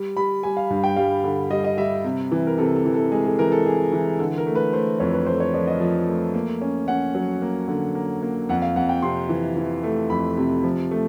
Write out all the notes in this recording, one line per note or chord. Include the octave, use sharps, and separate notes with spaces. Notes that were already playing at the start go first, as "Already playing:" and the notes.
Already playing: G3
G3 B5
G3 G#5
F5
G2
G5
G3 F5
D3
G3 D#5
D#5
G3 E5
C3
E3
A#4
C3 A4
A4
E3
A4
G#3 G#4
A4
E3 A#4
A4
G#3 G#4
E3
D3 A4
A#4
A3
B4
A3 C5
F2 C#5
B4
A3 C5
C#5
F3 D5
D#5
F3
A3
A#3
C#4
C#4 F#5
F#3
A#3
D3
A#3
A#3
F2 F#5
F5
F2 F#5
G5
C3 C6
E3
E3
A3
F2 B5
C3
F3
A3